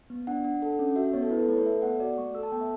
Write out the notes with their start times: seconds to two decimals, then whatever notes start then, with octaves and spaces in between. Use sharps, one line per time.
0.10 B3
0.27 D4 F#5
0.45 D4
0.62 A4
0.79 C#4
0.96 F#4 E5
1.13 B3 C#5
1.22 A4
1.31 E4 B4
1.40 A4
1.49 A3 B4
1.56 C#5
1.66 A4 E5
1.82 B3 F#5
2.00 F#4 D5
2.18 A3 C#6
2.35 A4 E6
2.43 A5
2.52 B3 G5
2.61 E5